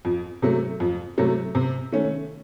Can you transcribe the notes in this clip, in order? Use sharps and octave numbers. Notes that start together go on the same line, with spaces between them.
F2
C3 F#3 A3
F2
C3 F#3 A3
C3
D#3 A3 C#4